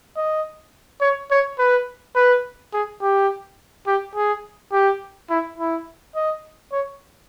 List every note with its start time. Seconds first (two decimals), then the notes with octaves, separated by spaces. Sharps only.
0.16 D#5
1.01 C#5
1.31 C#5
1.59 B4
2.16 B4
2.74 G#4
3.02 G4
3.87 G4
4.15 G#4
4.72 G4
5.30 E4
5.58 E4
6.16 D#5
6.72 C#5